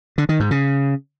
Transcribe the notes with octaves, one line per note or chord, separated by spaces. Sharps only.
D3
D#3
G#2
C#3